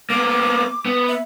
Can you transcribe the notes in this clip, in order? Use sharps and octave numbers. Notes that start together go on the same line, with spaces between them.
A#3 B3 D6
B3
E5